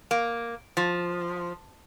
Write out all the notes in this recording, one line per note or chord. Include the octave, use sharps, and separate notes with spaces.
A#3
F3